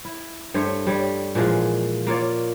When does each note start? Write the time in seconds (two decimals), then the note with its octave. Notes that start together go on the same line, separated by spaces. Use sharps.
0.05 E4
0.54 G2 A3 C5 C#5
0.87 G3 C#5
1.35 A#2 E3 F3 G#3
2.07 A#3 F4 C#5 D5